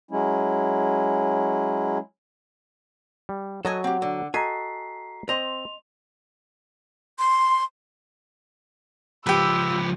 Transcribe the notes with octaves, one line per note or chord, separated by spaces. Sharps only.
F#3 G#3 C#4 E4
G3
F#3 F#4 A4 D#5 G#5
C4 G4 F#5
D3
F#4 A4 D#5 G#5 A#5 B6 C7
C4 C5 D#5 C6 F7
C6
C#2 F3 G4 B4 E6